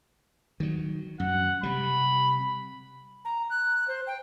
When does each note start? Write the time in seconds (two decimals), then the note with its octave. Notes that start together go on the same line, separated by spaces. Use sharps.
0.60 D#3 F#3
1.20 F#2 F#5
1.63 C3 G3 B5
3.25 A#5
3.50 F#6
3.88 C5
4.07 G5